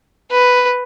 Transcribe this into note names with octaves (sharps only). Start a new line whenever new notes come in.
B4